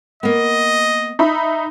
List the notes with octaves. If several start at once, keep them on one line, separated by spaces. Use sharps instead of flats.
A#3 B3 D#5
D#4 E5 B5